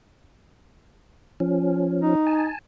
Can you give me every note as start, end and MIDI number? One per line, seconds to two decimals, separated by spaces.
1.40 2.15 53
1.40 2.15 61
2.01 2.48 63
2.27 2.59 80
2.27 2.59 81